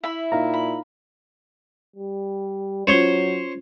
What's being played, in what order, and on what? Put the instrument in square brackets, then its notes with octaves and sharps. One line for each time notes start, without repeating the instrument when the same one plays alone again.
[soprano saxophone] E4 [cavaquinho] E5 B5
[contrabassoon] A#2 [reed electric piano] D#4 F5 A#5
[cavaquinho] B5
[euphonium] G3
[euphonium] F#3 [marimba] C#4 F4 [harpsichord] C5 C#5 C6